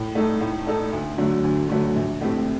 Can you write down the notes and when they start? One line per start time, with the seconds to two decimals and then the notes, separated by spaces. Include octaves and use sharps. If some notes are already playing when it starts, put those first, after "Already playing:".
Already playing: A2
0.15 A3 D#4 A4
0.41 A2
0.67 A3 D#4 A4
0.93 D2
1.18 D3 F#3 A3
1.44 D2
1.69 D3 F#3 A3
1.96 A#1
2.21 A2 A3 C4 G4